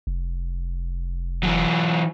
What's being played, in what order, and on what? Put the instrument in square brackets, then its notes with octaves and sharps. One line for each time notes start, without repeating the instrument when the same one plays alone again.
[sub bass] F1
[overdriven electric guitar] E3 F#3